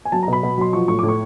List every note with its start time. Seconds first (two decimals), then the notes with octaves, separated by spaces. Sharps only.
0.05 G#5
0.12 F#3 A5
0.23 A#5
0.28 B2 B5
0.43 B2
0.58 F#3 C6
0.73 F3 C#6
0.88 A2 C#6
0.99 A2 D6
1.09 C#6